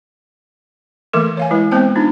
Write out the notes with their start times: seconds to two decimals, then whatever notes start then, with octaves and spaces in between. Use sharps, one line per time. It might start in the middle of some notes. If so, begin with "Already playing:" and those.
1.13 E3 A3 A#3 A4 A#4 D6
1.37 C#5 F5 G#5
1.51 G#3 E4 B4
1.71 G#3 B3 C4 C5 G5 A5
1.96 D4 D#4 F4